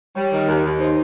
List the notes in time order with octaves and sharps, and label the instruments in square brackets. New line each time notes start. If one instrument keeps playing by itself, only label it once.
[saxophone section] G3 [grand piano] C#5
[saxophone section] D#3
D#2
D#2
[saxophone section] D#4 [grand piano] C5